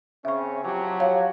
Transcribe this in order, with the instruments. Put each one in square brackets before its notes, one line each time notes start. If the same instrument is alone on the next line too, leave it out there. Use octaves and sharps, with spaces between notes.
[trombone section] C#3 C4 C#4 [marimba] E5 C#6
[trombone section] F3 F#3 G4
[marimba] C#5 F5